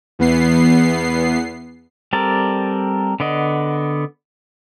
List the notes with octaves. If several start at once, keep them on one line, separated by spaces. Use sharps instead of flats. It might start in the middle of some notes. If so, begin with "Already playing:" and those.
E2 B3 C7
G3 C4 A4 A#4 D5
D3 B3 D5 D#5